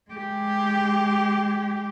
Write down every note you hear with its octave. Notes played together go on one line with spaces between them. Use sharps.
G#3 G4